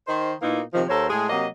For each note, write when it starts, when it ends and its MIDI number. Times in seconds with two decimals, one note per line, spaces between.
0.08 0.32 51
0.08 0.32 72
0.42 0.61 46
0.42 0.61 58
0.42 0.61 59
0.42 0.61 63
0.42 0.61 64
0.74 0.83 48
0.74 0.83 51
0.74 0.83 53
0.89 1.07 39
0.89 1.07 69
0.89 1.07 70
0.89 1.07 72
0.89 1.07 73
1.10 1.27 45
1.10 1.27 56
1.10 1.27 68
1.30 1.47 48
1.30 1.47 54
1.30 1.47 58
1.30 1.47 75